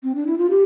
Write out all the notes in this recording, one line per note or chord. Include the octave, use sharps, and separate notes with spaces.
C4
D4
E4
F4
G4